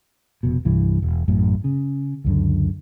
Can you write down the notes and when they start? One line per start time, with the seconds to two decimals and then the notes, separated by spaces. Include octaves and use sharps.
0.43 F1 B2
0.65 C2 G2 E3
1.02 E1
1.28 A1 F#2 A2
1.64 C#3
2.25 C#2 F#2 D3